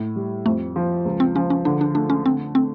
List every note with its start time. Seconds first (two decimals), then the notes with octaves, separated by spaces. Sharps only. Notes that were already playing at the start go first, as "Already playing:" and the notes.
Already playing: A2
0.16 G3
0.45 F2 A3
0.76 F3
1.05 C#2
1.20 C4
1.36 F3 C#4
1.50 C#4
1.65 D3 D4
1.81 D4
1.95 A3 D4
2.10 C#4
2.25 D3 C4
2.55 A3 C4